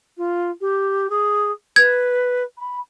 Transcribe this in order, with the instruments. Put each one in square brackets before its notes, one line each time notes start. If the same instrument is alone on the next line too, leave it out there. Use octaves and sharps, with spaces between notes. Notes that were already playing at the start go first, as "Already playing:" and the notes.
[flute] F4
G4
G#4
[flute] B4 [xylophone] G#6
[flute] B5